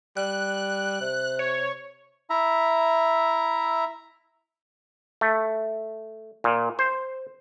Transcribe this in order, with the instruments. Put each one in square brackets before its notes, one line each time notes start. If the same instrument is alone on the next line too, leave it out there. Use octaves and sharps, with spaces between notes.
[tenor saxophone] G3 [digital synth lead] F#6
[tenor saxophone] C3
[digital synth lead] C#5
[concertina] E4 E5 A#5
[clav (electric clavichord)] A3
A#2
C5